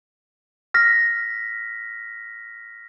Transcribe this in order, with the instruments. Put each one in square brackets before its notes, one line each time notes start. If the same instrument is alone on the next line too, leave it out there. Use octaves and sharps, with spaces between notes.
[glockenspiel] F6 A#6 B6